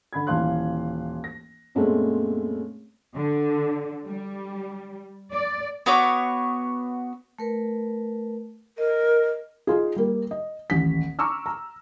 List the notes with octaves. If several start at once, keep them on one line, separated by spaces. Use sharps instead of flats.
D3 B5 G#6
D#1 E3 F5 C6 F#6
A#6
F#2 A#2 G#3 A3 B3 C4
D3
G3
D5
B3 F#4 C#5 D6
A3 A#4 B4
A#4 D#5
D#4 F4 G#4
G3 A#3
D#5
D#1 A1 B6
A#5 C#6 D6 E6 F6
A#5